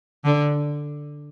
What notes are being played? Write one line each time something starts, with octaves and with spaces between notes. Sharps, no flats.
D3